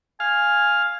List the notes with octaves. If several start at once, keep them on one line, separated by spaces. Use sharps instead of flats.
F5 G#5